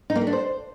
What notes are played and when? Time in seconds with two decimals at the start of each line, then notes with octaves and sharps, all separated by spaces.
0.10 D#4
0.15 A#3
0.21 A3
0.27 D4
0.33 C5